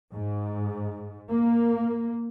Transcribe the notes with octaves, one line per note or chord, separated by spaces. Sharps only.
G#2
A#3